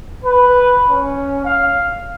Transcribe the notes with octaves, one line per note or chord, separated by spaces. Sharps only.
B4
C#4
F5